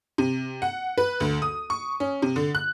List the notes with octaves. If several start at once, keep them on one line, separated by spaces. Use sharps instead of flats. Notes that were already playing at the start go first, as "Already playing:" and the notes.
C3
F#5
B4
D2
D#6
C#6
C#4
C3
D3
F#6